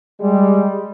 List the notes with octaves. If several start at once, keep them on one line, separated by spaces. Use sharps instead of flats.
G3 G#3